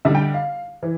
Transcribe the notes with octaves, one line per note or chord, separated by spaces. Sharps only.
D3 G3 D4 E5
G5
F5
E3